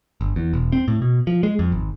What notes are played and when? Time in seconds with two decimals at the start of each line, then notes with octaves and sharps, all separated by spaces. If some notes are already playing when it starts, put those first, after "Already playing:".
0.21 G1
0.36 E2
0.53 E1
0.72 C4
0.88 A2
1.02 B2
1.27 F3
1.43 G#3
1.59 F2
1.72 G#1